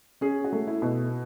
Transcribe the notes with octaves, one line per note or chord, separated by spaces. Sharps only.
C#4 G#4
F#4
A3
E4
B2